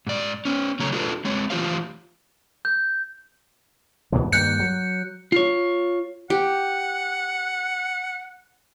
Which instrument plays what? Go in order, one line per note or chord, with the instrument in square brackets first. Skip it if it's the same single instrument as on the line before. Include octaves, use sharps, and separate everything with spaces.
[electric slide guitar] G#2 D5
B3 C#4
C#3 F#3 A3 A4 C#5 A#5
D4 F4 F#4 G#4 A4 B4
G#3 C4 C#5
E3 A3 F4 G4 C5 F5
[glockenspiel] G6
[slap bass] G#2 B2 E3
[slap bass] G2 D#3 A#3 [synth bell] F#6 G6 C#7
[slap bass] F#3
[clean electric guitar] F4 C#5
[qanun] G4 [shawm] F#5